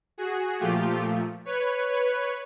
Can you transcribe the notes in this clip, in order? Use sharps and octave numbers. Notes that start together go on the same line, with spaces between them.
F#4 G#4
A#2 F3 A3 F4 G4
B4 C#5
B4 C#5